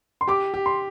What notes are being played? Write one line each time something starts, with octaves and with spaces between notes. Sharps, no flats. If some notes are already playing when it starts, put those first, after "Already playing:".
C6
G4 D6
G4
C6